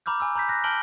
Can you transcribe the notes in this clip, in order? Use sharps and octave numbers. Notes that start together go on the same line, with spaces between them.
A#5 B5 D6 F6 G6
G#5 B5 E6
A#5 B5 G6 B6
F#6 A#6
A5 F6 G6 D7 F#7 G7